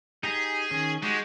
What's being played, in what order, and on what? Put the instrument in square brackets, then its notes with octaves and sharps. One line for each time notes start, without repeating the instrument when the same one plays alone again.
[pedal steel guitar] D#4 G4 A#5 [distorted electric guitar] G#4
[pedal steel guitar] D#3 C#4
[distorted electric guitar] G#3 [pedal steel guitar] D#4 F#4 G4